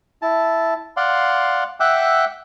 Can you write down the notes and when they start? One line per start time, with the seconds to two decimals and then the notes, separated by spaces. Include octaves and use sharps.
0.22 E4 A5
0.97 D5 F5 F#5 C6
1.80 E5 F#5 G5 D6 E6 F#6